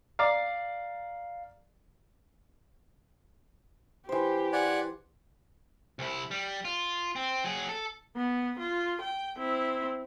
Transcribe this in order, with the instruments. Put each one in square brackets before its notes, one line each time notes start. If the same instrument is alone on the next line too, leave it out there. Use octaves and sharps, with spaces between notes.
[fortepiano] D5 A#5 [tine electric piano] F5
[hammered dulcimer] E3 C5 [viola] G4
[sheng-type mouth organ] D5 F#5 G#5
[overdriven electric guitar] C2 E4
G3
F4
C4
F#3 G#4
A4
[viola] B3
F4
G5
C4 E4